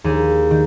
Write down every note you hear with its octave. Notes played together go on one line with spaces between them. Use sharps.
D#2 G#4
D#3